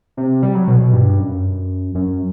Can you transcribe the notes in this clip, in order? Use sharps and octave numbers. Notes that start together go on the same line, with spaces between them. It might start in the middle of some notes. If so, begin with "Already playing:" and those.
C3
G3
F#3
B2
B2
G2
F#2
F#2